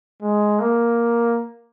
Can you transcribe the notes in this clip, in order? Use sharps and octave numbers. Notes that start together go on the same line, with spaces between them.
G#3
A#3